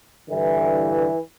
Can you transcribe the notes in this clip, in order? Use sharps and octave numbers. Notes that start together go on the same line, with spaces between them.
G2 D3 E3